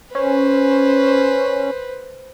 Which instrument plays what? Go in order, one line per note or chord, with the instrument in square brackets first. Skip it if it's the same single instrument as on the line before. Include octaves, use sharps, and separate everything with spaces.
[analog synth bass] C#4 [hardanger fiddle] B4 C5